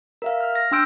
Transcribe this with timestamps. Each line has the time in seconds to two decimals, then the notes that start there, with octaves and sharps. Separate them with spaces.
0.22 A#4 E5 F5
0.41 F6
0.55 F6 A#6
0.71 D4 G5 C6 E6 G6 D7